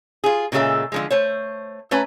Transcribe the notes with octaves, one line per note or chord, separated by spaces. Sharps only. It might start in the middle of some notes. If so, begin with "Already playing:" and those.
F4 G#4
A#2 C#3 G#3 F#4 A4 E5
D3 F3 G#3
A3 C5 C#5
A3 C#4 B4 A#5